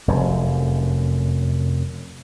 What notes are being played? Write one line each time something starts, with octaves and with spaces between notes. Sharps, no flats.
F1 F#2